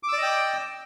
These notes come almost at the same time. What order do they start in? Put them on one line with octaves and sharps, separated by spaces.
D6 E6 D5 D#5 G5